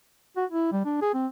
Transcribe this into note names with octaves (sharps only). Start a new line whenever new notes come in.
F#4
E4
G3
D4
G#4
C4